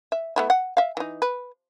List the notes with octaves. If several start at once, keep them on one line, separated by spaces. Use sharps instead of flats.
E5
A3 B3 E4
F#5
E5 F5
E3 D#4
B4